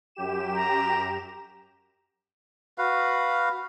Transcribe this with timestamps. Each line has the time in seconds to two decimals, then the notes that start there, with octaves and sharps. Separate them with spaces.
0.15 F#2 G4 E7
0.55 A#5
2.78 F#4 B4 F5